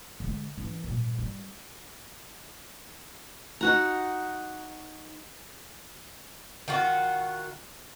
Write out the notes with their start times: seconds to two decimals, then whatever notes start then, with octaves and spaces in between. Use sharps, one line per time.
0.20 D3 G#3
0.58 E3 C#4
0.84 G2 A#2
1.18 G3
3.61 D#4 F#4 A#5
6.68 D#3 F4 F#4